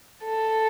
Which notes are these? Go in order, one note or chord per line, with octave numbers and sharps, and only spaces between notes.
A4